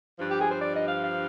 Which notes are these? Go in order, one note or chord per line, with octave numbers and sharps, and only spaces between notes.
G2 F3
G4
G#4
C5
D5
D#5
F5
F5